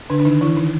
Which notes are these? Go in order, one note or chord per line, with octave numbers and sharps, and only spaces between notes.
D3 D4
D4
D#3 D#4
E3 E4
D#3 D#4